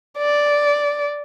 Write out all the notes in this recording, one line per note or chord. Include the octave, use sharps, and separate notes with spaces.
D5